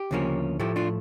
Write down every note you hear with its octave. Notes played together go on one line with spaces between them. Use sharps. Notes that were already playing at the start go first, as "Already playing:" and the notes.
Already playing: G4
D2 C#3 F3 A#3 C#4
A2 F3 A3 E4 G4
D4 F4